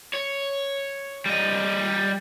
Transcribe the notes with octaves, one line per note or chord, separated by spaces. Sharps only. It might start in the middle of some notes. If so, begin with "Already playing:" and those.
C#5
G3 D#5